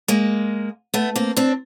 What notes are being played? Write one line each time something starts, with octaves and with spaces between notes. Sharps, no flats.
G#3 A#3
A3 B3
A#3 C4
C4 D4